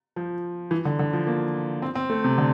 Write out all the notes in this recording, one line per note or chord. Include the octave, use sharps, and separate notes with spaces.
F3
E3
D3
D3
F3
A#3
C4
C4
A3
C3
D3